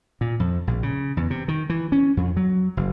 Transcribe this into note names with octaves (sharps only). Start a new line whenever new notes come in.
A#2
F2
A#1
C#3
E2
C3
D#3
E3
C#4
F2
F#3
F#1